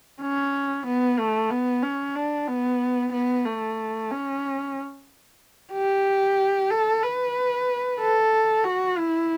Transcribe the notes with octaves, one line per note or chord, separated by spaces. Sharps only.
C#4
B3
A3
B3
C#4
D4
B3
B3
A3
C#4
G4
A4
B4
A4
F#4
E4